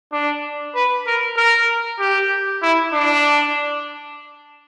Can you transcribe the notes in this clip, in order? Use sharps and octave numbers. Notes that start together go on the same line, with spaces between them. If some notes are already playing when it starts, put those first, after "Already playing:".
D4
B4
A#4
A#4
G4
E4
D4